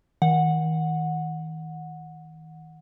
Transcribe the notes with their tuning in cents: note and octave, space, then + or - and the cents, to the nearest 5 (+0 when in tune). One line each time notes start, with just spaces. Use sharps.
D#3 +35 F#5 -15